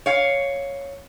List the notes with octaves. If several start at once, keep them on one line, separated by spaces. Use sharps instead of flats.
C#5 F5